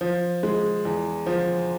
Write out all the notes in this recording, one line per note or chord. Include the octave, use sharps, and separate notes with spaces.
F3
G#3
E2
F3